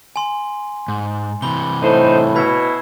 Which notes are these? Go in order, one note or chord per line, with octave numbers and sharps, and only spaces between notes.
G#5 C6
G#2
C3 E3 B5 G7
A2 D3 D#4 C5
B2 E4 B5 G#6